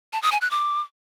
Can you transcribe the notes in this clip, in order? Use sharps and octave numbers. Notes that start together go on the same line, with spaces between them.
A5
D#6
G#5
F#6
D6